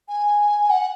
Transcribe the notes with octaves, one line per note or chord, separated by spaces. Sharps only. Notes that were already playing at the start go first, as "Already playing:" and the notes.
G#5
F#5